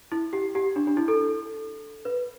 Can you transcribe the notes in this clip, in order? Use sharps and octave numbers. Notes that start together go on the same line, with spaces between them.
E4
G4
G4
D4
D4
E4
A4
B4